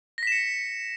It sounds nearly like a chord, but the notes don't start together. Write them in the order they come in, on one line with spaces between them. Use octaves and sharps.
A#6 B6 E7 C#7